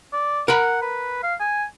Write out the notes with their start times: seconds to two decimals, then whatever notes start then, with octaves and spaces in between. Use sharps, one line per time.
0.13 D5
0.48 A#4 F#5 B5
0.82 B4
1.23 F5
1.40 G#5